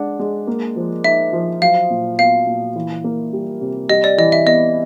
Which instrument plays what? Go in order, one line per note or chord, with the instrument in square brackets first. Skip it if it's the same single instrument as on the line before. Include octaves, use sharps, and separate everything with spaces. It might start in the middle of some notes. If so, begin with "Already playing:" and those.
Already playing: [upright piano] G#3 D4 [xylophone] F#5
[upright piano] G#3
A#3
F3
[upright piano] D#4 [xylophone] E5
[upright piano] F3
[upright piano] F#3 [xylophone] F5
[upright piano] A#2
[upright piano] B3 [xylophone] F5
[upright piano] A#2
E3
A#3
G3
C3
[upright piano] G3 [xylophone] D#5
[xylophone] D5
[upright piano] E3 [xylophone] D#5
[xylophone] E5
[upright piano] B3 [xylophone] D#5